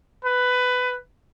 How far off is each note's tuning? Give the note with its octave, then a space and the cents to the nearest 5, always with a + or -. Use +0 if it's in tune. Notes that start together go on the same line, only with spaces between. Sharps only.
B4 +15